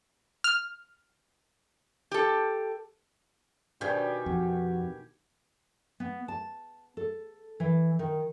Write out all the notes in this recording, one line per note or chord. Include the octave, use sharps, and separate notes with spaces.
F6
G4 A4
B2 D#3 B3 D4 G4 G5 G#5
F2 F#4
B3
A5
A4
E3
D#3